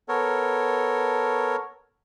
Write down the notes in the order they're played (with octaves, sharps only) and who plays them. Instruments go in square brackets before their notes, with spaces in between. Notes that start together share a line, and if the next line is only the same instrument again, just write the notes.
[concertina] B3 A4 A#4 C#5